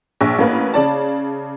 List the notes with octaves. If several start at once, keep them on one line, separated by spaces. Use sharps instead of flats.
A#1
A1 A#3 B4
C#3 D5 A5